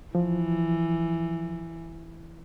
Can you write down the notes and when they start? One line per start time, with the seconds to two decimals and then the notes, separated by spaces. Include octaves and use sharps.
0.15 E3 F3